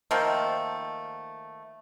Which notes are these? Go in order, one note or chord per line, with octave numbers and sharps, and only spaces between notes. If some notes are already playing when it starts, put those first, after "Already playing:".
D#3 F3 A3 A#3